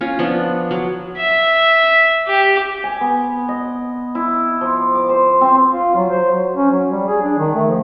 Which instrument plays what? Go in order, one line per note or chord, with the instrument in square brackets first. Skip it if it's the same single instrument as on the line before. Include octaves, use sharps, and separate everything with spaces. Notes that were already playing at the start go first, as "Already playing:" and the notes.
[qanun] C#4 F4
F3 B3 D4
F#3
[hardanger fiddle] E5
G4
[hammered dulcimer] G#5
B3
D#5
E4
F3
D6
C5
C4
[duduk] F4
F#3
C5
F#3
C#4
F#3
G3
G#4
D4
D#3
A3
F3